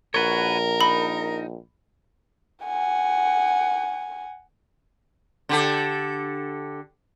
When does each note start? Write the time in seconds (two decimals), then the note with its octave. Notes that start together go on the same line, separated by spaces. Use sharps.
0.14 A#1 F#4 A#4 B4 C#5
0.81 D#4 B5
2.65 F#5 G#5
5.49 D3 G4 A4